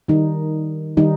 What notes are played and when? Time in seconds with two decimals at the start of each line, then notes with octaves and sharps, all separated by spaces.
0.08 D#3 G3 D#4
0.97 D#3 G3 D#4